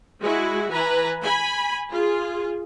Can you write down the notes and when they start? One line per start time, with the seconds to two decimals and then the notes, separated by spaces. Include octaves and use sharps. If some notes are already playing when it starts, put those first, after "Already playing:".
0.21 G#3 E4 F#4
0.71 E3 B4 G#5 A#5
1.24 G#5 B5
1.92 F4 G#4